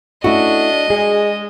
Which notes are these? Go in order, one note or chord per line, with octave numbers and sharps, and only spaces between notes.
A3 C#4 D4 E4 F#4 D#5
G#3 G#4